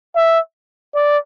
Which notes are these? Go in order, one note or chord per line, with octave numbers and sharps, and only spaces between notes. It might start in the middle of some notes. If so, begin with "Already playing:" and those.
E5
D5